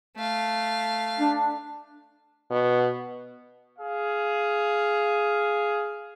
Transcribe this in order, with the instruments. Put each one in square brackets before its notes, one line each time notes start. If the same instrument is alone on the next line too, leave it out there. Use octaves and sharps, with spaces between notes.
[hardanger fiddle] A3 F5
[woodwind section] D4
[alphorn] B2
[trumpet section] G#4 F5